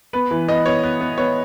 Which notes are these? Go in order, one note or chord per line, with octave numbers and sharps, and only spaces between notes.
B3 B4
E3
B3 D#5
B3 C#5
B3 B4
B3
B3 C#5